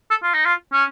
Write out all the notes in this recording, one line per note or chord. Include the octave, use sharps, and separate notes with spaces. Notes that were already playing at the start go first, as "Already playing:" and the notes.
A4
F4
D#4
F4
C#4